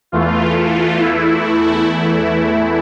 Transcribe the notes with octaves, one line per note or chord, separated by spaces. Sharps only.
E2 E3 A3 F4
F4
E4